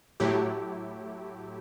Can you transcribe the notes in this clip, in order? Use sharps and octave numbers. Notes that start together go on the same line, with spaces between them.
A2 F#3 A3 E4 G4